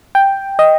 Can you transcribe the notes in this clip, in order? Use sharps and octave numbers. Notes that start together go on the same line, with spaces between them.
G5
D#5